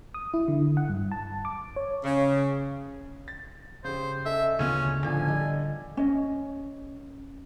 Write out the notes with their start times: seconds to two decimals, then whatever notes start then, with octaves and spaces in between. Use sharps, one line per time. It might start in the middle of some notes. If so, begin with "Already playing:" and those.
0.14 D#6
0.34 E4
0.48 D3
0.77 F#5
0.89 G2
1.12 A5
1.45 D6
1.76 C#5
2.04 C#3
3.28 A6
3.84 C#3 G4 C5
4.26 C#4 A4 D#5 E5
4.59 D2 C#3 B3 C#4 F4 G#5 D#7
5.04 A1 D3 F3 D4 G#5
5.28 G3 A4 D#5
5.97 C#4 D#5